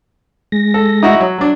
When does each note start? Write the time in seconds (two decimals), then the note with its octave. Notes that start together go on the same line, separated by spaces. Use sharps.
0.52 G#3 A#6
0.74 A4
1.03 D#4 E4 F#4
1.20 F#3
1.38 F#3 D4